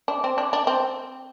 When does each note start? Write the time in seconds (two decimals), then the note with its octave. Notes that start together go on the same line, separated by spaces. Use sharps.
0.08 D4
0.24 C4
0.38 D4
0.53 D4
0.67 C4